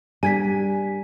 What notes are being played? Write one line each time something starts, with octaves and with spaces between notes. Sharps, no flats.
G3 D4 A#4 G#5 G#6 B6